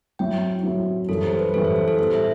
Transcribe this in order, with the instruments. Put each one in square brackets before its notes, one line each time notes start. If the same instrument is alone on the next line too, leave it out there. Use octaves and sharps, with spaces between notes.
[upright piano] F#3 C4 E4 [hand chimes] G5
[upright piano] F#3 C4 E4
[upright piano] F#2 E3 G3 [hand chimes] A4
[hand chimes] C5
B4
[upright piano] F#2 E3 G3 [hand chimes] A4
[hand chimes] C5
C5
A4
[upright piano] A2 G3 B3 [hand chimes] C5
[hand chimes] E5